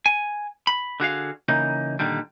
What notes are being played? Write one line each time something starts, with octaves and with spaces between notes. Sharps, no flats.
G#5
B5
D3 F#4 G#4 F5
C#3 E3 A#3 D#4
A#2 D3 D#3 G3